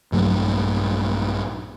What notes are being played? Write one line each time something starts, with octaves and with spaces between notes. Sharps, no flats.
A#1 G2 F#3 A3